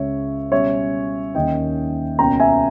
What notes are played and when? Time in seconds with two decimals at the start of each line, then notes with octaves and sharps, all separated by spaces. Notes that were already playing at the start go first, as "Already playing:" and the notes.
Already playing: C#2 C#3 G#3 C#4 C#5 E5
0.52 B2 G3 C#4 C#5 E5
1.35 D#2 D#3 A#3 C#4 D#5 G5
2.18 C#2 B2 A#3 C#4 G5 A#5
2.40 E5 G#5